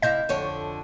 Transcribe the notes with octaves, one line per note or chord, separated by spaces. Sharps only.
C3 E4 D#5 F5 G6
F2 D3 C#5